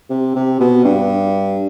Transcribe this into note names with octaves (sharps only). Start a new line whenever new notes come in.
C3
C3
B2
G2